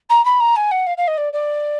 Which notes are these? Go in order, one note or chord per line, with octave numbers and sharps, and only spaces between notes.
A#5
B5
A#5
G#5
F#5
F5
F5
D#5
D5
D5